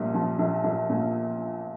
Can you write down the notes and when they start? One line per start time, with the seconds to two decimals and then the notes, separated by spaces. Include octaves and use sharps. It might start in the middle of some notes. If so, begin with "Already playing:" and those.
Already playing: A#1 A#2 G3
0.14 F3
0.39 A#1
0.64 A#1
0.89 A#2